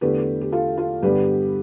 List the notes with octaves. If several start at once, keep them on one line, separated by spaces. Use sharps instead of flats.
E2 D3 A3 G4 B4
G4
F4 A4
F4 A4
G2 D3 G3 B3 G4 B4